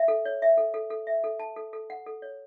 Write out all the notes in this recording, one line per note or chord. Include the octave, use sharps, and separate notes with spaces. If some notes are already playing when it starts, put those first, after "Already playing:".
Already playing: E5
A4
C#5
E5
A4
A4
A4
E5
A4
A5
A4
A4
F#5
A4
C#5